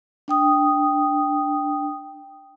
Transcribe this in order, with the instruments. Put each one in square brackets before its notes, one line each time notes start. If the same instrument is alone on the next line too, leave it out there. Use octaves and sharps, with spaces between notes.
[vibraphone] D4 G5 D#6